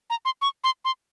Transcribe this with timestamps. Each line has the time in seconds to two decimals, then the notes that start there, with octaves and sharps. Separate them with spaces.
0.10 A#5
0.25 C6
0.42 C#6
0.64 C6
0.85 C6